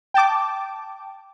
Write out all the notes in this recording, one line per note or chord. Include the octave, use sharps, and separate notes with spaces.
G5 A5 D6